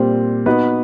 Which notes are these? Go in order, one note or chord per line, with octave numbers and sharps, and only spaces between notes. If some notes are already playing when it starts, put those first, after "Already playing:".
Already playing: A#2 G3 C4
B3 D#4 F#4 B4